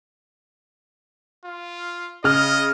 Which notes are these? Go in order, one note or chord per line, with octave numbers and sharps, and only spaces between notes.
F4
C#3 D#5 F6